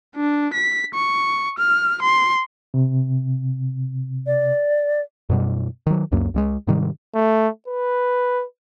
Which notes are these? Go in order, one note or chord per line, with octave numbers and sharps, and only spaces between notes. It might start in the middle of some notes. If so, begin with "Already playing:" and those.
D4
B6
C#6
F6
C6
C3
D5
F#2 B2 G3
D#3 F#3
C#2 F#2 A#3
C#2 G3 G#3
G#2 C3 D#3 G3
A3
B4